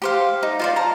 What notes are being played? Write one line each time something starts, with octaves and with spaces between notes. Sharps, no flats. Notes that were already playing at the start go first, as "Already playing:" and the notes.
G4 C5 F5
D#4
F4 C5 D5
A5 A#5